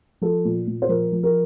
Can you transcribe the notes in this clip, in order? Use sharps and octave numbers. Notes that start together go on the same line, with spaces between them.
F3 A4
A#2
A#2
C5
F3 A#4
F3
A#4